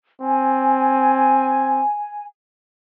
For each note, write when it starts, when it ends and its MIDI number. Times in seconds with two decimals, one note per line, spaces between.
0.21 1.83 60
0.21 2.25 80